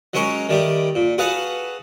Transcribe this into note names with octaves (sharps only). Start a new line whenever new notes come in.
F#3 G#3 C#4 A#4 C#5
D#3 G3 A3 G4
A#2
F#4 G#4 A4 B4 F5 F#5